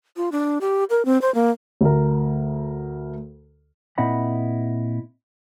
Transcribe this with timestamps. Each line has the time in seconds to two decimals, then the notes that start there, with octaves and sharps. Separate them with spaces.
0.17 F4
0.32 D4
0.61 G4
0.90 A#4
1.05 C4
1.22 C5
1.35 A#3
1.81 D2 A#4
3.98 A#2 C4 E4 D#5 F#5 B5